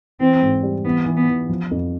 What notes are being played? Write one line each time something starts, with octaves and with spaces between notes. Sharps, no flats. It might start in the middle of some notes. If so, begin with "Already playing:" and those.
E3 C4
G#2
G3
E3 B3
E3
B3
E3
F3
F2